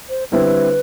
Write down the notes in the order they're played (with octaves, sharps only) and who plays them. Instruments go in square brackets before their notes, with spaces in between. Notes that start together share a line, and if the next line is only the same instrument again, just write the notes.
[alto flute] C5
[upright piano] D3 G3 C4 E4 [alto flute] B4